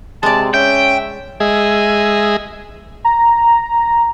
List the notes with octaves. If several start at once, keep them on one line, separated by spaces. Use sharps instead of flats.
C3 G#3 D5 A5
C#4 E5 G5
G#3 G#4 D#5 E5
A#5